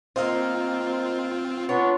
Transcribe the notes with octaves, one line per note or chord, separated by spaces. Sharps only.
A#3 C4 D#4 F4 C5 F5 F6
B3 D4 F4 C#5